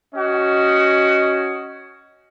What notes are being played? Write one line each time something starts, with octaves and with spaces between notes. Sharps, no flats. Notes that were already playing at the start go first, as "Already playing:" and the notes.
C#4 F#4 D#5